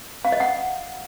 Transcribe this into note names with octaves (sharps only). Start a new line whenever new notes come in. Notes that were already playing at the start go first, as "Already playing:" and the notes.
F5
D#5
F#5